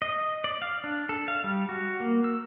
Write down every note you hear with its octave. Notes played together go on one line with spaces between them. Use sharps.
D#5
D5
F5
D4
A4
F5
G3
F#4
A#3
E6